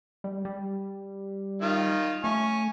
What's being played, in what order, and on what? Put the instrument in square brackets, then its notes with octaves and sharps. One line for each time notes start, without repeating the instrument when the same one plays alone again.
[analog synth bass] G3
G3
[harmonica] D#3 F4
[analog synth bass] A3 [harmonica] G#5 C#6